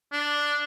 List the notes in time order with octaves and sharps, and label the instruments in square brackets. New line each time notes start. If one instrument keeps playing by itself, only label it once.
[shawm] D4